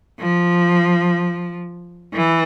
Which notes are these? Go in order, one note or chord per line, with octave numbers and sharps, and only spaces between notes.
F3
E3